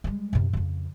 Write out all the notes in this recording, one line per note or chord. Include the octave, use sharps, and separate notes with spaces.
G3 G#3
F#2 C3
F2 C#3